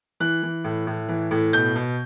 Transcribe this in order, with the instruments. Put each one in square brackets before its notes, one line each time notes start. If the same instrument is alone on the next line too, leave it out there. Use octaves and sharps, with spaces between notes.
[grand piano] E3 F#6
E3
A2
A2
E3
A2
B2 G6
B2